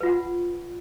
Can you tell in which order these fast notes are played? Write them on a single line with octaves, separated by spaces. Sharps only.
B4 F4 F#5